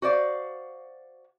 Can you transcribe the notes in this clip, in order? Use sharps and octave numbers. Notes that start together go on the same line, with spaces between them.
F#4 C5 D5 F5